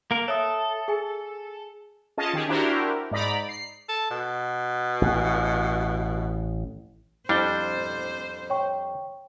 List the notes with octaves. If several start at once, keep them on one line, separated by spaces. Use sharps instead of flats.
A#3 A#4
A4 C#5 E5 D#6
G#4 G#5
C#4 F4 G#4 D#5 A5
D#3 G4 G#4
D4 E4 F#4 G4 A#4 C5
G#2 D#4 D5 A#5 B5
C7
A4
B2
A1
F2 G3 D4 E4 C5 G7
C#5 G5 C#6